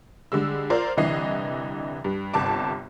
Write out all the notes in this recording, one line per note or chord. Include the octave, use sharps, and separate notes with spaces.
D3 G3 G#3 E6
F4 A#4 C5 D5
C2 D3 E3 D#5 C7
G2
G1 C2 A5 D6